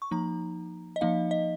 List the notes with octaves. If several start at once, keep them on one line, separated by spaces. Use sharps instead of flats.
C#6
F3 A#3 D#4 A#5
D#5
F3 A#3 D#4 F5
D#5